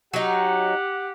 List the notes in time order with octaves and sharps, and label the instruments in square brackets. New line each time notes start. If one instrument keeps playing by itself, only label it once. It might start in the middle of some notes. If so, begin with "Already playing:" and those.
[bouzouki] F#3 D#4 [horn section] G4 F#5